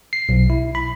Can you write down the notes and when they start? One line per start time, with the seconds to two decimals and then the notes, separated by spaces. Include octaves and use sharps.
0.13 C7
0.29 B1
0.50 E4
0.75 B5